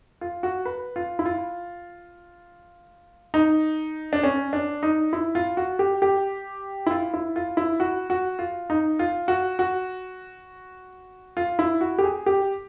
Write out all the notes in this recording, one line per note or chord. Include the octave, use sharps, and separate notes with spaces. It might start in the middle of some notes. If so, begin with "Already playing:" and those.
F4
F#4
B4
F4
E4
F4
D#4
D4
C#4
D4
D#4
E4
F4
F#4
G4
G4
E4
F4
E4
F4
E4
F#4
F#4
F4
D#4
F4
F#4
F#4
F4
E4
F#4
G4
G#4
G4